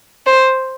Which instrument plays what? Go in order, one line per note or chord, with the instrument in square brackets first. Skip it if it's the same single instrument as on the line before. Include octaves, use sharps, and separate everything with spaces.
[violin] C5